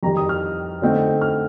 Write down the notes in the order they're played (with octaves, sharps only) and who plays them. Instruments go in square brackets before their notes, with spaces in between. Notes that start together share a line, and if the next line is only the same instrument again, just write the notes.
[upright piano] F2 D#3 G3 A#5
D#6
F6
D3 A3 C4 D#4
F6